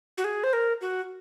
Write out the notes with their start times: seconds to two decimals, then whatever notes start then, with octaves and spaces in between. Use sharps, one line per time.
0.18 F#4
0.24 G#4
0.44 C5
0.53 A#4
0.81 F#4